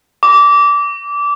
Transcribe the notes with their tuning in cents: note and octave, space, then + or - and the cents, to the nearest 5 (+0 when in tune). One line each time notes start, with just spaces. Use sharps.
D6 -20